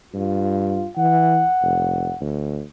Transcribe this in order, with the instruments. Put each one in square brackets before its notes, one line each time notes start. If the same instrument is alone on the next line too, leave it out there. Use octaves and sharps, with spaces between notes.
[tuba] G2 [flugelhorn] F4
[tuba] E3 [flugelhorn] F#5
[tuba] F1
D2